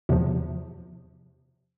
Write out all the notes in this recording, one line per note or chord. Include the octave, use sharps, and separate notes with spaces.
E2 C3 F3